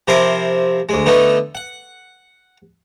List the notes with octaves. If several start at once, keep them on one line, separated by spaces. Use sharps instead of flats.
C3 F3 E4 A#4 C6 D6
D2 G#3
D3 A3 B3 D#4
F#5